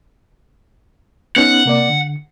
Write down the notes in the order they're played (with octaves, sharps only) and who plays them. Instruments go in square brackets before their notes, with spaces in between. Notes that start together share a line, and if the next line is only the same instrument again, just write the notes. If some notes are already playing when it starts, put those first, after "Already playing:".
[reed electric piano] B3 C#4 D#4 [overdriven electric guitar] F#5
[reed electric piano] C3 A#3 D5
D3